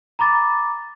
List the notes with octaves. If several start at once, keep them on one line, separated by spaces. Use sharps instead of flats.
A#5 B5 D6 A6